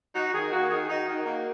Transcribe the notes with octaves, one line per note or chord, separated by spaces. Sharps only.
D#4 F#4
D#3 G#4
A#3 F#4
D#3 G#4
D#4 F#4
D#3
A#3